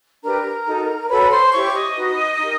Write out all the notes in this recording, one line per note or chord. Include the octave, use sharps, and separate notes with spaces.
D4 G4 A#4 B4 A#5
D#4 F#4 A4
F#4 A4 B4 C#5 B5
C5 C6
E4 G4 C5 C#5 C#6
D6
D#5 D#6
D#4 F#4 B4
D#4 G4 A#4